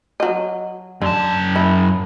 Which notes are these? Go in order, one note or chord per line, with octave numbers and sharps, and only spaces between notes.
F#3 D#5
F#2 D3 A5
E4